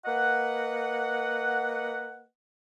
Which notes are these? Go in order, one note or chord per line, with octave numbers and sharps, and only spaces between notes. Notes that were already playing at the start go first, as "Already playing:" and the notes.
A#3 B4 D#5 F#5